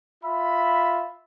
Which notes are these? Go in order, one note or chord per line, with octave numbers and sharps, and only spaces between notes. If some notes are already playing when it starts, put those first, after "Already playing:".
F4 E5 B5